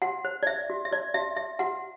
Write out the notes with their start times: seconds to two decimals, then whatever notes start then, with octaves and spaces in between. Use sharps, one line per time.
0.02 F#4 F#5
0.25 C5
0.43 D5
0.47 C5 E5
0.70 F#4
0.85 E5
0.91 F#4 D5
1.14 F#4 E5
1.36 F#4 E5
1.59 F#4 F#5